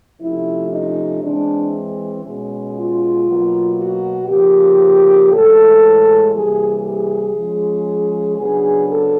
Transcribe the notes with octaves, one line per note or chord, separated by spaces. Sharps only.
C3 F3 A3 C#4 E4
D#4
E3 G#3 C4 D4
B2 G#3 C#4
F4
B2 F#3 A#3
F#4
C#3 F3 A#3 G4
A2 E3 G#3 A4
C3 E3 G3 A#3 G#4
G#4
F3 G#3 C#4
C#3 F#3 B3 D4 G#4
A4